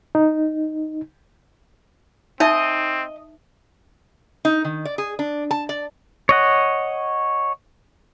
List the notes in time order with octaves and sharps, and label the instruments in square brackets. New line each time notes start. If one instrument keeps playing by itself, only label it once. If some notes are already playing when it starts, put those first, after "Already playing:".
[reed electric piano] D#4
[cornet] C4 [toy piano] D#4 E5 A5 [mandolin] D#5
[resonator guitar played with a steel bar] D#4
D#3
D5
G#4
D4
A5
D5
[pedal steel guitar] C#5 D#5 F#5